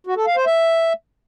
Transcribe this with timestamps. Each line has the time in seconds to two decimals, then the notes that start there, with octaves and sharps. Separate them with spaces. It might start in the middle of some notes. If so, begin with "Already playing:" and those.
0.07 F#4
0.17 A4
0.26 F5
0.36 C5
0.46 E5